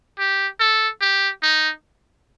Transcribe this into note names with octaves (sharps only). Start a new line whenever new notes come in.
G4
A4
G4
D#4